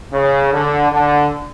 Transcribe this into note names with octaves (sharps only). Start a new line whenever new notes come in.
C#3
D3
D3